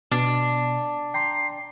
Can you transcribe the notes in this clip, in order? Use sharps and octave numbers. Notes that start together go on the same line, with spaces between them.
B2 D4 A5
G5 A#5 C6 C7